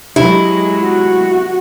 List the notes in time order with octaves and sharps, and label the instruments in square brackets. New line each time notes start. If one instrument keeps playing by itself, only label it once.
[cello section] F#3 G#3 [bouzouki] E4 [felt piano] G4
[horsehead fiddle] F#4